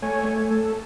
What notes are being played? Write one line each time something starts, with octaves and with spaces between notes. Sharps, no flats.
A3 C#5 G#5
A3
A4